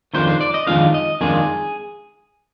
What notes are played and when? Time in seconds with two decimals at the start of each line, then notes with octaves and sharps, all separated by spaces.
0.14 F2 D#3 G#3 D4 F4 C5
0.27 C5
0.41 D5
0.54 D#5
0.67 F2 D#3 G#3 D4 F4 F5
0.94 D#5
1.21 F2 D#3 G#3 D4 F4 G#4